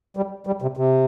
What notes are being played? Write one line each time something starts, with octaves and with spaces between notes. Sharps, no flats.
G3
G3
C3
C3